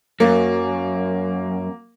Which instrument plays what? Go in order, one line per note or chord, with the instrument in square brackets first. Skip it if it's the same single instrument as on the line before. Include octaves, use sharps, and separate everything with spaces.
[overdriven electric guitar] F#2 [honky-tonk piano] A#3